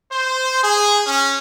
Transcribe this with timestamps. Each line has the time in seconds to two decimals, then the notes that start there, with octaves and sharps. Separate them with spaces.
0.11 C5
0.64 G#4
1.07 C#4